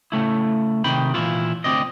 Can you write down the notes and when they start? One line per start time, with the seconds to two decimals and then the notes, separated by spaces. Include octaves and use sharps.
0.12 C#3 A3 E4
0.84 C3 D#3 G5 B5
1.14 A#2 E3 A3 A#3 E4 F4
1.64 D2 C4 D5 D#5